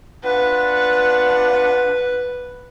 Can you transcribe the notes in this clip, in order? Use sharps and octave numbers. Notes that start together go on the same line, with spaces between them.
D4 F4 B4 F#5